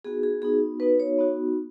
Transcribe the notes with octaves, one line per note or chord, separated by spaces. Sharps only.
B3 D#4 F#4 G#4
G#4
B3 D#4 F#4 G#4
B3 D#4 F#4 B4
C#5
B3 D#4 F#4